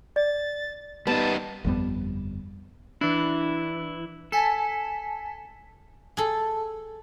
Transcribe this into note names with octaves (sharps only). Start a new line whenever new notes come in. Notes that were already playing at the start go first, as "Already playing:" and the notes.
D5 A6
G3 B3 D#4 A5
G1 F2 G3 B3
E3 D4 E4
A4 G#5 A5 B6
G#4 A4